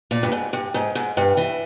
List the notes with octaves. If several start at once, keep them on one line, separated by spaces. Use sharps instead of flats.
A#2
G2
G#2
G2
G#2
G#2
G2
E3